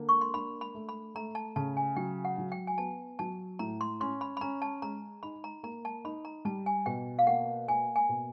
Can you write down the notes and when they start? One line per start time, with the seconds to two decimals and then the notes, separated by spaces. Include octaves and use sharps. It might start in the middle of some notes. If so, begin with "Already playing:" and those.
Already playing: D3 A#3
0.09 C#6
0.21 C6
0.34 D4 B5
0.61 B5
0.75 A3
0.89 B5
1.15 A3 A#5
1.35 A5
1.56 C#3 A5
1.77 G#5
1.96 F#3 G5
2.25 F#5
2.38 F#3
2.52 G5
2.67 G#5
2.78 B3 A5
3.19 F#3 A5
3.59 A2 A#5
3.81 C6
4.00 C#4 C6
4.21 B5
4.37 B5
4.41 C#4 A#5
4.62 A5
4.82 G#3 A#5
5.23 D#4 B5
5.44 A#5
5.63 A#3 A#5
5.85 A5
6.04 D#4 B5
6.25 A#5
6.45 G3 A5
6.66 G#5
6.86 B2 G5
7.19 F5
7.27 A#3 F#5
7.68 A#3 G#5
7.96 G#5
8.09 B2